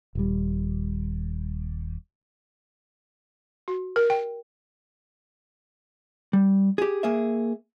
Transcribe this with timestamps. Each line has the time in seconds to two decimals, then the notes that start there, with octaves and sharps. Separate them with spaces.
0.15 D#1 G3
3.68 F#4
3.96 A#4
4.10 G5
6.33 G3
6.78 G4 G#4
7.03 A#3 G#4 E5